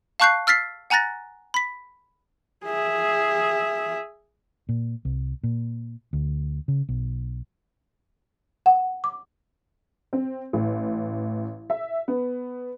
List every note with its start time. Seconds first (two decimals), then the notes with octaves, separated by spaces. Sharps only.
0.20 F5 A5 C#6 F#6 G6 C7
0.47 E6 F6 A6 B6 C7
0.90 F#5 G#5 A#5 F#6 A6 A#6
1.54 B5 B6
2.66 G#4 E5
4.69 A#2
5.05 C2
5.43 A#2
6.13 D2
6.68 C#3
6.89 B1
8.66 F#5
9.04 D6
10.13 C4
10.53 A1
11.70 E5
12.08 B3